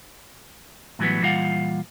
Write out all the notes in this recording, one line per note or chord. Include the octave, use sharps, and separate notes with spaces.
A2 E3 F#3 G3 B3
A#2 E3 G3 F4 F5 F#5